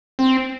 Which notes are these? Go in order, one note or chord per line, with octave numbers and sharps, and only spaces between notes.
C4